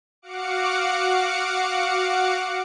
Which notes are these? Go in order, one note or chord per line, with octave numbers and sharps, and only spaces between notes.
F#4 F5 F#5 D6 C#7